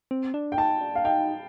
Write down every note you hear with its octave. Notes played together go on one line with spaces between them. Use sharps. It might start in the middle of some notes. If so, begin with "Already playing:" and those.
C4
D4
G5
D#4 A5
D4
F5
D#4 G5